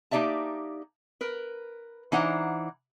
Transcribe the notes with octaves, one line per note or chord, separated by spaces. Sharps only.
A#3 D#4 G4 D5 E5 A5
A#4 B4
E3 D4 D#4 C5 F#5 A#5